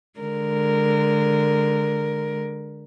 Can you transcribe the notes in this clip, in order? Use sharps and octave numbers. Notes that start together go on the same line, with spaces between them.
D3 G#3 A#4